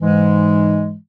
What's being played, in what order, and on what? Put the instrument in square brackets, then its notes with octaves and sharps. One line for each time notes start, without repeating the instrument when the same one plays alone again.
[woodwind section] G#2 E3 G#3